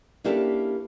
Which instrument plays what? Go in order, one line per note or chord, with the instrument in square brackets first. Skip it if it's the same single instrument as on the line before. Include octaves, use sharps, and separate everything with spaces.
[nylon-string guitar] A#3 C#4 D4 E4 G4 A4